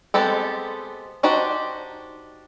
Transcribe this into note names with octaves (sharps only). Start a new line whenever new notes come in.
G#3 B3 C4 G4 A4
D4 D#4 F#4 G4 C5